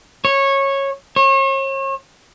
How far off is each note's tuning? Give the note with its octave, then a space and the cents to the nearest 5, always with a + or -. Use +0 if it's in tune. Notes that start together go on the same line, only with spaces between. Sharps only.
C#5 -15
C#5 -40